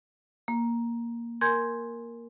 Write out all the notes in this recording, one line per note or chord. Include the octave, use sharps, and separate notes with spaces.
A#3
A#4 G#5 C6 G6 G#6